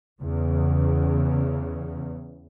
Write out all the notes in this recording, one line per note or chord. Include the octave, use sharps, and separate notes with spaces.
E2 C#3